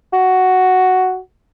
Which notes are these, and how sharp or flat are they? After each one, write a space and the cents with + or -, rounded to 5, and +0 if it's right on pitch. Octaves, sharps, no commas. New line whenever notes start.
F#4 +5